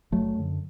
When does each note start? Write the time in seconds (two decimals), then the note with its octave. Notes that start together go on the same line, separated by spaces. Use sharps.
0.12 F#1 F#3 A3
0.35 F#2 D3